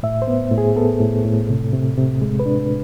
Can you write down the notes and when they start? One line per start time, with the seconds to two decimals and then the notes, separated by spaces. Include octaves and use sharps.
0.03 A2 E5
0.22 C5
0.28 B3
0.51 A2
0.58 G#4
0.76 B3 A4
1.00 A2
1.25 A2
1.49 C3
1.73 C3
1.97 C3
2.22 G#3
2.39 B4
2.46 D4